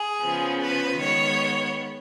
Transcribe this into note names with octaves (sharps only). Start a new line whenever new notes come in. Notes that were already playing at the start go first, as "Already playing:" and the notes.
Already playing: G#4
C#3 F3 B3
B4
D#3 G#3 B3 C#5